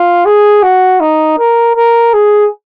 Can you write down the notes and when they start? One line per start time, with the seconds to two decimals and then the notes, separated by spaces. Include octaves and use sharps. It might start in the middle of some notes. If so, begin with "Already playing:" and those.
Already playing: F4
0.25 G#4
0.63 F#4
1.00 D#4
1.39 A#4
1.76 A#4
2.14 G#4